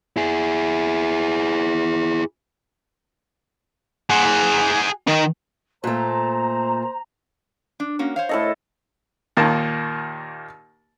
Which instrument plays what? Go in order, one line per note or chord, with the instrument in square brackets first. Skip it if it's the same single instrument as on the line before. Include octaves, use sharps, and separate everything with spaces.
[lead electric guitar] E4 G#4
[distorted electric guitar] G#4 F#5
D#3 D#4
[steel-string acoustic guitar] A#2 A3 [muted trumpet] C5 [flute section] A#5
[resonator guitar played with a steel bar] D4
A#3 C#4 F#4
C5 C#5 F5
[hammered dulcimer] A2 A4 D#5
[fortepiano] D#2 A#2 D#3 A#3 A5